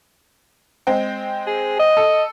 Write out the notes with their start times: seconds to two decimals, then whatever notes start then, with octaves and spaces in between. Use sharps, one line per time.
0.87 G#3 C4 G5
1.47 G#4
1.79 D#5
1.97 A4